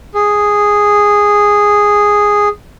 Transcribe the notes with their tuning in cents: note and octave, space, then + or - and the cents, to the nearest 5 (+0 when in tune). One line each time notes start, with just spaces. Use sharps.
G#4 -5